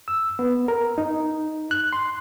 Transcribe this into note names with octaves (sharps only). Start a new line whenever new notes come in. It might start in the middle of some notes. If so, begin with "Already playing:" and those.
E6
B3
A#4
D#4
F#6
C6